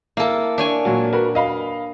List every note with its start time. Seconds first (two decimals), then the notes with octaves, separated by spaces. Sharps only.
0.17 A#3 E4 A4
0.58 D4 C#5 G#5
0.85 A#2 F#3 F#4
1.13 F#4 A#4 B4
1.35 D#5 F5 B5